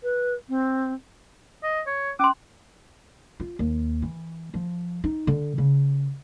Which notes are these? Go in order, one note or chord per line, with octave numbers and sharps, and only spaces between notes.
B4
C4
D#5
C#5
C#4 C6 D6
F4
D#2
E3
F3
D#4
D3
C#3